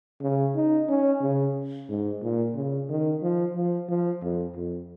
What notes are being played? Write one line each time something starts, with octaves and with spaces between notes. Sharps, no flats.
C#3
D#4
C#4
C#3
G#2
A#2
C#3
D#3
F3
F3
F3
F2
F2